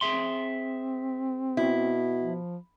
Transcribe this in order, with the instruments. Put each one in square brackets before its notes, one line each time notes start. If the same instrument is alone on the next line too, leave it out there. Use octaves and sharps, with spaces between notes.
[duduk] C4 [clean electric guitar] G#4 E5 C6
[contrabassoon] B2 [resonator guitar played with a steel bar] E4
[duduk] F3